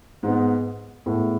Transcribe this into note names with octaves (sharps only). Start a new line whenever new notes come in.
G#2 G#3 B3
A2 G#3 B3 A4